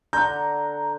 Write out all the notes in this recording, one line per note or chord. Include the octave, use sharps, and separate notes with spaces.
D3 F#5 A#5 G6